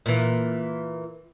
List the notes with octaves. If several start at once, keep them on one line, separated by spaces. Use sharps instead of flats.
A#2 E3